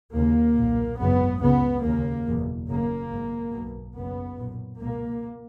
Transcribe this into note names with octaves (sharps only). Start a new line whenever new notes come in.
D#2 C#3 A#3
B1 A#2
G#1 F#2 C#3 B3
C#2 C#3 B3
D#2 C#3 A#3
F#1 E2 B2
F#1 F#2 C#3 A#3
G#1 G#2
B1 B2
F#1 F#2 C#3 B3
B1 A#2
C#2 B2 A#3